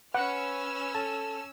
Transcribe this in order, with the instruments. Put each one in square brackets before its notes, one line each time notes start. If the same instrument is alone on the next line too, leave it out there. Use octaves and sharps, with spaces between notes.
[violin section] C#4 E6 F6 [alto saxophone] B4 [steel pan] F#5
[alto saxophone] A4 [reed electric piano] A5